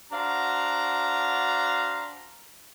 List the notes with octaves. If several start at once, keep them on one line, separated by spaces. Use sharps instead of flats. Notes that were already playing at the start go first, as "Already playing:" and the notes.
D4 F#4 C5 F5 A#5